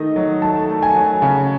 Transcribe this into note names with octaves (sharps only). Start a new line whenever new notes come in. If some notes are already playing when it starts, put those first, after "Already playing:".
Already playing: D#3 A3 D#5
F#3
A3 A5
A3
G#5
F#3
C#3